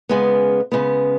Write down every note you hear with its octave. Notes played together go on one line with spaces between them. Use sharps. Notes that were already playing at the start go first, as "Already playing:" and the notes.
C#3 G#3 B3
C#3 G#3 B3